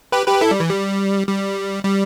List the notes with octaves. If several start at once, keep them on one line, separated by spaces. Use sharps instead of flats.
G4 B4
G4 B4
E4 A4
G3
E3
G3
G3
G3